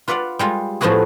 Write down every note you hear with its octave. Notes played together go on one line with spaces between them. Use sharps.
F4 B4 D5 F5 F#5
G3 G#3 F4
A2 F3 G#3 B3 F#4 G#4